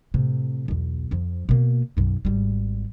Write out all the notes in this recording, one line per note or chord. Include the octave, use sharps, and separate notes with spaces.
A2 C3
B1 E2
F2 F3
B2 A#3
B1 F#2
G#1 G3